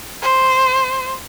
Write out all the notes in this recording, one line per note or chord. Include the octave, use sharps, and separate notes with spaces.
C5